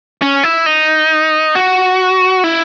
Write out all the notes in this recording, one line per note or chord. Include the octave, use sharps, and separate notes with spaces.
C#4
E4
D#4
F#4
E4